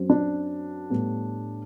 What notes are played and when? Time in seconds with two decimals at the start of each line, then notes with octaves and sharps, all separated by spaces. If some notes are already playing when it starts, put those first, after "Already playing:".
Already playing: F#2 F#3 C4
0.10 D4
0.90 A2 G3 B3